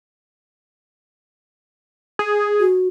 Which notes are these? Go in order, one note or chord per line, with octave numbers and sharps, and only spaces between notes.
G#4
F#4